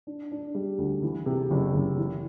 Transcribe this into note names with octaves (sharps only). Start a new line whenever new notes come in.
D4
D4
G3
D2
E3
C3
F#1
F#1
E3